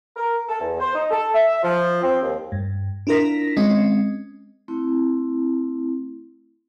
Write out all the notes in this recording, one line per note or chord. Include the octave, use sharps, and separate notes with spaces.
A#4
A4
E2
C5
D#4
A4
E5
F3
C4
D#2
G2
D4 E4 F4 A#4 A#6 B6
G#3 C4 C#4 D#5
A3 C4 E4